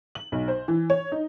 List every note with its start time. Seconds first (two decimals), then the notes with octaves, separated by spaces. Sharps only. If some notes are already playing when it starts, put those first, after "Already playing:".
0.15 F#7
0.32 B1
0.48 C5
0.68 E3
0.90 C#5
1.12 D#4